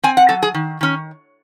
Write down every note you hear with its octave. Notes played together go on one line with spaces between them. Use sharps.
C4 G#5
F#5
F#3 A4
G#4
D#3
D#3 C#4